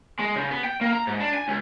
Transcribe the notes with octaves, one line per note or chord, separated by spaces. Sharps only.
G#3
C#3
B3
G5
A#3
A#5
G#2
D4
G#5
C#2